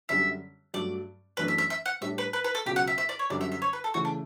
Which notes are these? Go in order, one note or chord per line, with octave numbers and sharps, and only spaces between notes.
F#2 D3 G3 D4 E5
G2 F#3 A3 D5
F#2 E3 A3 D4 B4
E5
E5
E5
F#5
A2 G3 D4 E5
B4
B4
B4
A4
C#2 B2 F#3 G4
F#5
E5
E5
D5
C#5
F#2 D3 G3 D5
E5
E5
C#5
B4
A4
C#3 E3 A3 E4 F#4
D4